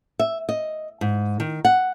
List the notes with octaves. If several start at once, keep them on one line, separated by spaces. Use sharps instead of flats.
E5
D#5
G#2
D#3
F#5